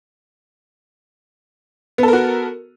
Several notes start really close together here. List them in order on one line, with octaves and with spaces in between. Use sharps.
B3 A4 A#4 F#4